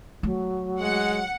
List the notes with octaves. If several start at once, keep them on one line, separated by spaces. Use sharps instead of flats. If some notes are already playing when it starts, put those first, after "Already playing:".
F#3 A3
G#3 F#5